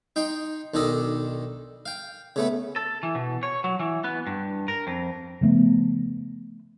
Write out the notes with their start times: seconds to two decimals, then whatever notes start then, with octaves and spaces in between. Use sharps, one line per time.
0.16 D#4 G5 C6
0.74 B1 D#3 D4 A4 D#5
1.86 F5 G5
2.36 C#3 A3 B3
2.76 A4
3.03 E3
3.15 B2
3.43 C#5
3.64 F#3
3.80 E3
4.04 B3
4.27 G2
4.68 A#4
4.87 F2
5.41 C#3 F3 A3 B3